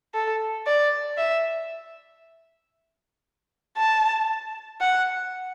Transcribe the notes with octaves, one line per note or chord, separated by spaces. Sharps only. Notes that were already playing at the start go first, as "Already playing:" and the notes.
A4
D5
E5
A5
F#5